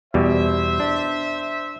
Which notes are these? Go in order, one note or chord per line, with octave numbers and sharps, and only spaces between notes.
E2 B2 G3 C5 E5
D4